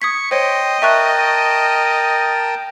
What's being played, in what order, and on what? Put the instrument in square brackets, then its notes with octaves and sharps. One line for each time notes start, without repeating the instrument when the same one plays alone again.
[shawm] C#6 [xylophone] D#6 G#6 B6
[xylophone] C5 C#5 [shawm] D#5 [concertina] G5 C6
[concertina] A#4 G5 A5 [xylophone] E5 C#6 F#6